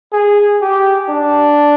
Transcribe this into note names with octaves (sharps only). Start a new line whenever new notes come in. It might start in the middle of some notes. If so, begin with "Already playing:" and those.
G#4
G4
D4